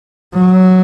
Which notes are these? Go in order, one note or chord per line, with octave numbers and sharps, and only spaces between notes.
F#3